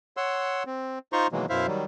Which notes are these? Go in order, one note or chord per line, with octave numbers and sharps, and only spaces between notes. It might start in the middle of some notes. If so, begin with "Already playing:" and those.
C#5 F#5 C6 E6
C4
D#4 F4 C5 A#5 C6 C#6
B2 D#3 E3 F#3 G#3 A#3
F#2 B2 E4 C5 E5 F5
D#3 F#3 G3